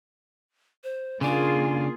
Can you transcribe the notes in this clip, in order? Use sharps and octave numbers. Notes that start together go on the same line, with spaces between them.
C5
C#3 A#3 D4 F4 G#4 G#5